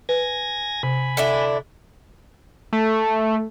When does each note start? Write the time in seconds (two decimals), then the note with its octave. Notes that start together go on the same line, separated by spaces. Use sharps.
0.09 B4 G#5 G#6 A#6
0.83 C3 G#5 B5
1.17 D3 D4 E4
2.73 A3